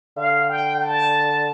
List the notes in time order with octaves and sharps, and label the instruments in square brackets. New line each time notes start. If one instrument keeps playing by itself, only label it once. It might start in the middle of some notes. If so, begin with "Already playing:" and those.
[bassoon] D3 [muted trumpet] F5
[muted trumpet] G5
A5